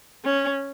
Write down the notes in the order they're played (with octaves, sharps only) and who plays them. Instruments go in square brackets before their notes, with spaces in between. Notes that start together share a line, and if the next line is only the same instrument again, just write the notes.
[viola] C#4